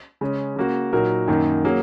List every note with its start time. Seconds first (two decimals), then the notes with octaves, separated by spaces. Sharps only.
0.21 C#3 G#3 C#4
0.56 C#3 A#3 F#4
0.93 A#2 F#3 D#4 F#4 A#4
1.28 F#2 D#3 F#3 A#3 D#4
1.65 F#3 A#3 C#4 G#4